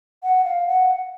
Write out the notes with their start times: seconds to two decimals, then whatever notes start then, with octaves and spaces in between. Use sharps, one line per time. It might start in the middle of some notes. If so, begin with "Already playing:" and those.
0.23 F#5
0.44 F5
0.67 F#5